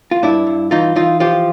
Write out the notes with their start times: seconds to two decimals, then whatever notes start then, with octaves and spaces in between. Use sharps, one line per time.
0.11 F4
0.23 G2 D4 E4
0.47 G2
0.71 E3 D#4 F4
0.96 E3 D#4 F4
1.20 F3 F4 G4